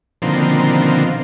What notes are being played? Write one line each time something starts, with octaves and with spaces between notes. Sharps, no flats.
B2 D3 D#3 F3 A#3 C4